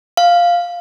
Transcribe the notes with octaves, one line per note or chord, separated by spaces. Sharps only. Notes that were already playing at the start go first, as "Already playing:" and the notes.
F5